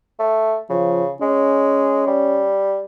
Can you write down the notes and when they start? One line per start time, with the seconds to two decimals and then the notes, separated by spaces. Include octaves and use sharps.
0.19 A3
0.69 C#3 F3
1.21 G#3 C#4
2.07 G3